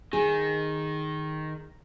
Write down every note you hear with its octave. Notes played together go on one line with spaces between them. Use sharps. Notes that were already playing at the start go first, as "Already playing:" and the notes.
D#3 G#4